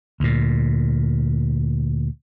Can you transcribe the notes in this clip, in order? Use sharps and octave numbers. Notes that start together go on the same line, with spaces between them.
D2 A#2